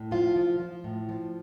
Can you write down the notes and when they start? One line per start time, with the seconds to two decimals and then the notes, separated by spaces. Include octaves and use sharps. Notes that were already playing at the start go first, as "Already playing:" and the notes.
Already playing: A2
0.11 F3 F4
0.36 F3
0.60 F3
0.84 A2
1.09 F3